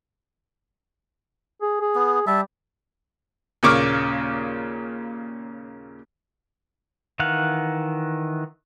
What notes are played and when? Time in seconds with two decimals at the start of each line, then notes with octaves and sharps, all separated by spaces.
1.61 G#4
1.80 G#4
1.95 B3
2.27 G3 E5 A5
3.63 D#2 A#2 C#3 C#6 D6 F6
7.20 D#3 E3 F5 F#5